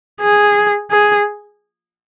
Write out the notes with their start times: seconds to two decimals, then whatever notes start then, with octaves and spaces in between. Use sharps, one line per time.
0.21 G#4
0.91 G#4